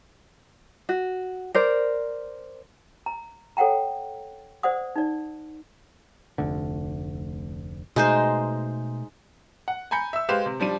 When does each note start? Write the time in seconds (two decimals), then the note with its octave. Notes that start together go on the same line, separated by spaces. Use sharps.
0.89 F#4
1.54 A#4 C5 D5
3.06 A#5
3.57 A4 C#5 F#5 G5 A#5
4.63 C5 D5 F#5 D#6
4.96 D#4 D5
6.38 F1 D2 D3
7.96 B2 G#3 A3 D#4 C5
9.68 F#5
9.91 G#5 A#5 B5 G6 C#7
10.13 E5 E6
10.29 G#3 G4 B4 C5 F5 E7
10.46 C3
10.60 F3 G3 D4 D#7